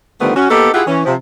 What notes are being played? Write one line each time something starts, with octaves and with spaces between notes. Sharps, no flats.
D3 D#3 F3 G3 A3 B3
C#4 F#4
A#3 B3 D#4 G4 A4
E4 F4 G4 G#4 E5 F#5
E3 C#4
C3 F3